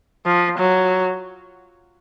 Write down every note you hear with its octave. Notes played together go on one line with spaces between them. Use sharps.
F3
F#3